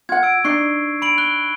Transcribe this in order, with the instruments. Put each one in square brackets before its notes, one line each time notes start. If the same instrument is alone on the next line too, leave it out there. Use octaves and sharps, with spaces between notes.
[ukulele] F4 F#5 [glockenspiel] G#6
[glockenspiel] E6 D7
[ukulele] D4 D#4 [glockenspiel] C#6 C7
[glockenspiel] B5 D7 F#7
F#6 G7